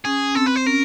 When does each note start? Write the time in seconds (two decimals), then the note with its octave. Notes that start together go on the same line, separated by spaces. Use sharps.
0.05 C#4 G#4
0.35 C4 A4
0.46 B4
0.56 C5
0.66 C#4 A#4